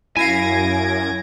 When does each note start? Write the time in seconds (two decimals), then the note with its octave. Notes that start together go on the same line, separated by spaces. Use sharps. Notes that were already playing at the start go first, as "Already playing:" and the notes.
0.17 F#2 E4 E5 F5 G#5 G#6 A#6 D7